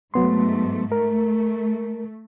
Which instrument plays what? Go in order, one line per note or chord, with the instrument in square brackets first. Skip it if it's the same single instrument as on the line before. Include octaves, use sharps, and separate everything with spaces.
[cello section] G#2 A3 [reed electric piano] F#3 B3 C6
[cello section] A3 [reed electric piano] A#4